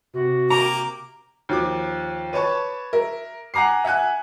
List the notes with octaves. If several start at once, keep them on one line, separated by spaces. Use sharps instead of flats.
C3 F#4
A#3 G4 A#5 D6
D#2 F3 D6
B4 C#5 A5 C#6
A#4 E5
F#5 G#5 A#5 D6 C7
E5 F#5 G#5 F#6